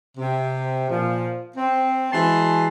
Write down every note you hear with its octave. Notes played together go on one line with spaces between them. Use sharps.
C3
A#2 F3
C4
E3 G#3 F#4 G#4 A5 C6